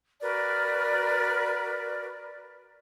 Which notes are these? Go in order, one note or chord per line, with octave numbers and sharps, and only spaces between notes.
F#4 A#4 B4 D5